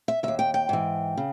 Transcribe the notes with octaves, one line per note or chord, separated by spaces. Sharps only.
E5
D#2 D#3 E5
G5
G5
G#2 E3
C#3